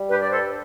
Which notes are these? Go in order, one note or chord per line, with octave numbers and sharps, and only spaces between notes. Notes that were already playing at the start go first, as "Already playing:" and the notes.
Already playing: G3
G2 G4 B4
D5
A4 C5